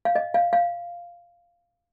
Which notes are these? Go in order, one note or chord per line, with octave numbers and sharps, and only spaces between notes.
F5
D#5
F5
F5